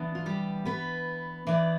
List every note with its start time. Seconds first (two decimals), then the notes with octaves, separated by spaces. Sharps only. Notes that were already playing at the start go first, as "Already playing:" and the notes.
Already playing: E3 B3 D4
0.15 F4
0.26 G3 G4
0.65 B3 B4
1.47 E3 B3 D4